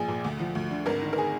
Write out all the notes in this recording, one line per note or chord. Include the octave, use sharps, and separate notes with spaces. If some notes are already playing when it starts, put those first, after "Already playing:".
Already playing: A#1 F3 G#4
A#2
D2
F3
D2
D3
G#1 A#4
D#3
A#4
G#4